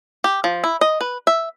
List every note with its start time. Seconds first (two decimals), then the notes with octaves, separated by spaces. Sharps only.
0.24 G4
0.44 F3
0.64 E4
0.81 D#5
1.01 B4
1.27 E5